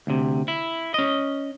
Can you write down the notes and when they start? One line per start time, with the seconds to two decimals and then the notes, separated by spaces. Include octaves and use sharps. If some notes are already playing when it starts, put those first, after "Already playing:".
0.07 D2 C3
0.48 E4
0.94 C#4 D#5